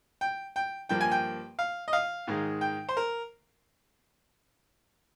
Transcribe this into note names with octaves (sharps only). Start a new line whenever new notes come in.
G5
G5
G2 F3 A#3 G5
G#5
G5
F5
D#5
F5
G#2 D#3 G#3
G5
C5
A#4